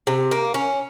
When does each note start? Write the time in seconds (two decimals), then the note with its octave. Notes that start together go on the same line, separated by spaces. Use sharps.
0.07 C3
0.31 A#3
0.54 C#4